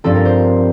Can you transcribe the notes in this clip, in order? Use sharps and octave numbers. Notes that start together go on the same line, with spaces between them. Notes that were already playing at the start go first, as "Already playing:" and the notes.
G2 F3 C4 A4
A#4
C5